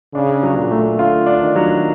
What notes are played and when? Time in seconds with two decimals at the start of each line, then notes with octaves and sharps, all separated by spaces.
0.14 C#3 D4
0.43 F#3
0.57 A#2
0.71 A3
0.99 D3 F4
1.26 D4
1.41 D#3
1.56 F#3